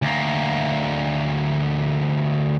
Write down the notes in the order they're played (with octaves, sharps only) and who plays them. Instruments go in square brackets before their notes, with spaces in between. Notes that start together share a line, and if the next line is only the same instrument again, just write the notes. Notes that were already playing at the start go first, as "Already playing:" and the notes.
[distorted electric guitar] D2 A#3